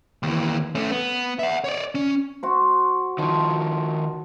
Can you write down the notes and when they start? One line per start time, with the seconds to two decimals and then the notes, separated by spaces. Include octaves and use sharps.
0.23 D#2 E3
0.75 A3 C#4
0.90 B3
1.39 E5 F#5
1.64 C#5 D5
1.95 C#4
2.43 F#4 C5
3.18 D#3 F3 C#5 A5 C6